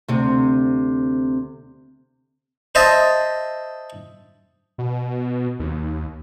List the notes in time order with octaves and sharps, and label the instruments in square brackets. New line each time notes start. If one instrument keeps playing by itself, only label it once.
[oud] D2 C3
[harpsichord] C5 D#5 E5 A5
[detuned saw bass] B2
D#2